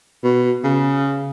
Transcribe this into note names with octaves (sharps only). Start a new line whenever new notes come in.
B2
C#3